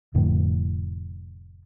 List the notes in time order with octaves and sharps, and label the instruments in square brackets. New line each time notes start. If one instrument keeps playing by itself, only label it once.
[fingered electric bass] F1 F2 A2 D3